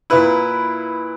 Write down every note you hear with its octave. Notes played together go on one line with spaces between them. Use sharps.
A#2 A#3 E4 B4